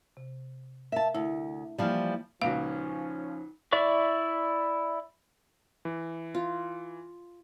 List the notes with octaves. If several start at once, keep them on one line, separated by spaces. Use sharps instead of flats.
C3
A#4 E5 F5 A5
D2 E4
E3 F3 G3 A#3 A5 F6
C#2 A#2 F3 C#4 D#4 F#4 F5
E4 D5 E5 C#6
E3
F4